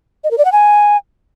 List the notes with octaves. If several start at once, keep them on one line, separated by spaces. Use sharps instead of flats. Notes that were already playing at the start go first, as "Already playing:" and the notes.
D#5
A#4
D5
F#5
G#5